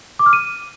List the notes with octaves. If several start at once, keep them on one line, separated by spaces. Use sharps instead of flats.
D6
F6
D#7